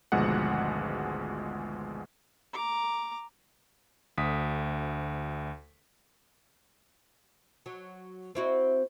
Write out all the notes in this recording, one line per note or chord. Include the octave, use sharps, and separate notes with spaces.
G#1 D2 B2 F3 G#3 F#5
A#5 D6
D2 D#6 B6
F#3
C4 E4 F#4